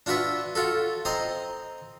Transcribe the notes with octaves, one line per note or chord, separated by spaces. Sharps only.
D4 F4 F#4 B4 E5
F4 F#4 A4
C4 D#5 A#5 C6